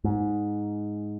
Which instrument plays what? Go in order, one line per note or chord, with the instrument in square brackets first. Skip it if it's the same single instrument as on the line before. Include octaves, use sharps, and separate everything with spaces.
[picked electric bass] G#2